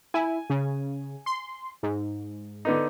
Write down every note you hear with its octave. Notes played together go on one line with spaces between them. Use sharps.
E4 G#5
C#3
C6
G#2
D3 B3 D#4